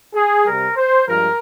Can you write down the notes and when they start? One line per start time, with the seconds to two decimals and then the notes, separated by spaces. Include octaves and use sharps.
0.14 G#4
0.45 C3 G3 A#4
0.76 C5
1.07 G2 F3 G#3 A#4